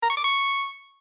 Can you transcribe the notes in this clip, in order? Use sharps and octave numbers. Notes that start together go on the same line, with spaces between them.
A#5
C#6
D6
C#6